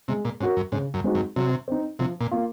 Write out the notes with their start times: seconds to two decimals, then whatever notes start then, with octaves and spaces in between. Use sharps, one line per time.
0.08 C3 G#3
0.25 A#2
0.40 G#2 C#4
0.43 F#4 A#4
0.57 F#2
0.72 G#2 C#3
0.94 F#2
1.04 G#3 C4 D#4 F#4
1.15 F#2
1.36 C3 F#3
1.68 C4 D#4
1.99 C3 F3
2.21 A#2
2.31 A#3 F4